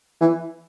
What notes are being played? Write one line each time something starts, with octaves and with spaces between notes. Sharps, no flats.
E3